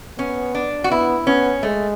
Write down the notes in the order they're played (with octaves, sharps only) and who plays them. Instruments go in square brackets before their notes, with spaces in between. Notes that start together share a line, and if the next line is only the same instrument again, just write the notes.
[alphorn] B3 [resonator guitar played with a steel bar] C#4
[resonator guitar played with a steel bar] D4
F#4
[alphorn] B3 [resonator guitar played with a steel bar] E4
[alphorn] B3 [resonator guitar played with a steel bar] C#4
[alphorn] G#3 [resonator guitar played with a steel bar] A3